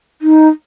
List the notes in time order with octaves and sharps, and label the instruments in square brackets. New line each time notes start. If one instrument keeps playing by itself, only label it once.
[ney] D#4